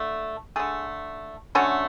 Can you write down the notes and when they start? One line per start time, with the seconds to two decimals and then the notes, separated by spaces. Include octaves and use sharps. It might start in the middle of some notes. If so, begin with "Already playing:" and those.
Already playing: D3 A3
0.56 D3 A3 G#4
1.55 D3 F#3 A3 C#4